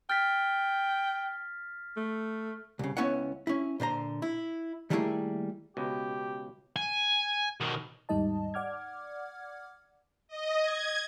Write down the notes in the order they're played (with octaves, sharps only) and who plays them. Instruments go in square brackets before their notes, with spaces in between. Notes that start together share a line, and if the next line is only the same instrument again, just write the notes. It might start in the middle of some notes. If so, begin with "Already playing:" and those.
[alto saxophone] G5 [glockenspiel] F6 A6 B6
[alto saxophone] A3
[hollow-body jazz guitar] C2 C#3
C#2 B3 C#4 E4 C#5 F#5
C#4 E4
A#2 D3 C5 A#5
E4
D#3 G3 A3 A#3 E4 G#4
[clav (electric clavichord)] C#2 B2 [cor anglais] G4
[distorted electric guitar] G#5
B2 D#3
[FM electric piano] D#2 G#2 G3 D#4 D#5 A5
D5 F#5 D6 F6 G#6
[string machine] D#5
G#6